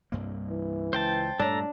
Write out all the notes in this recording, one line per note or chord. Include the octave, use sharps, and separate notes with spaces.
C2 G2 A#3
E3
C#2 C5 G5 A5
G2 A#2 A3 D4 A4 A#5